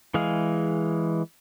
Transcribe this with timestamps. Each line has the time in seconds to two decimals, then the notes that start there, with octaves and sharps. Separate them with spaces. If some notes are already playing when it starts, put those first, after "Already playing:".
0.14 E3 G#3 G#4 F5